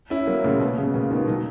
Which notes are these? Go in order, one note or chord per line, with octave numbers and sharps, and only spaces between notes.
C#4 E4
F#3 A#3
A#2 C#3
B2
C#3
B2
A#2 C#3
B2 D#3
D#3 F#3